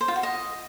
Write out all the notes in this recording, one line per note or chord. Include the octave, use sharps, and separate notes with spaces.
C5
F4
F#4
D#5